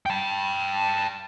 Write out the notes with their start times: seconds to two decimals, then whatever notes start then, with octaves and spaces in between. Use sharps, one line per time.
0.06 G5 A5